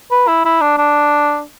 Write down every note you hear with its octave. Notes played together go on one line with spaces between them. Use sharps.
B4
E4
E4
D4
D4